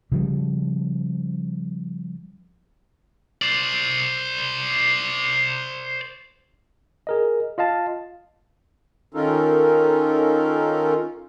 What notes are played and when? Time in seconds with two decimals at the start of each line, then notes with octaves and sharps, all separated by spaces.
0.12 C#3 F3 G3
3.42 C5 D5
7.07 G#4 A#4 D#5
7.58 F4 D#5 F5 A5
9.14 D#3 C#4 D#4 F4 A4 A#4